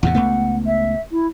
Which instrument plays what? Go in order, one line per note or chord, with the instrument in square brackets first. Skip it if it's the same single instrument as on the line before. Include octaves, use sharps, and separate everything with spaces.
[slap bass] E2 A2 C3 [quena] F#5
[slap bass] C#2 A3 B3
[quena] E5
E4